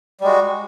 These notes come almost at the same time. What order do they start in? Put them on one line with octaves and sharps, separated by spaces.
G3 G#3 F#4